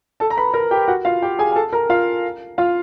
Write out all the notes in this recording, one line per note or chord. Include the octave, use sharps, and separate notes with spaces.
A4 A5
A#5
B4 B5
A#4 A#5
G4 G5
F#4 F#5
F4 F5
G4 G5
G#4 G#5
G#5
A4 A5
A#4 A#5
F4 F5
F4 F5